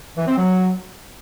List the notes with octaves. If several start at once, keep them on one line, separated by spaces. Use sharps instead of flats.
E3
C4
F#3